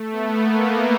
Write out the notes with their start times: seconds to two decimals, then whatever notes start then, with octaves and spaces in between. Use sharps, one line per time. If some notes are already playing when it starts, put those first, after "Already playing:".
Already playing: A3
0.11 B3
0.39 A#3